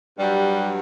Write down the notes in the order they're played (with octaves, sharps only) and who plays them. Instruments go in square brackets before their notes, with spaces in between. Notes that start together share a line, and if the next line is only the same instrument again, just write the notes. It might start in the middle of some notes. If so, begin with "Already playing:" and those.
[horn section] G2 F#3 G3